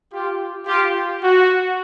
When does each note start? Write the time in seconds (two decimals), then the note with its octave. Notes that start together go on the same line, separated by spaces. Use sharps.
0.12 F4 G4
0.67 F4 G4
1.22 F#4